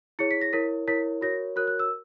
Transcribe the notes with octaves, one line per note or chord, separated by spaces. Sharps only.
E4 G#4 C#5 C#7
B6
A#6
E4 A#4 C#5 B6
E4 A#4 C#5 B6
F#4 A#4 C#5 A#6
F#4 A#4 C#5 F#6
F#6
E6